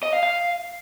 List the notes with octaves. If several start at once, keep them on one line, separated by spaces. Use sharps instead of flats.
D#5
F5
F5